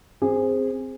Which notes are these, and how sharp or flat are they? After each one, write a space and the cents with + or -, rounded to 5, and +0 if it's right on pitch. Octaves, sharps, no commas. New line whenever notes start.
C4 +0 G#4 -15